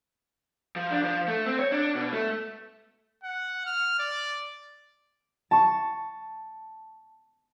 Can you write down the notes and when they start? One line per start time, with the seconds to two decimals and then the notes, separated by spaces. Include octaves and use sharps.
0.76 F3
0.90 D4
1.03 F3
1.28 A3
1.46 C4
1.59 C#5
1.72 D4
1.95 B2
2.12 A3
3.24 F#5
3.66 F6
3.99 D5
5.51 A5 C#6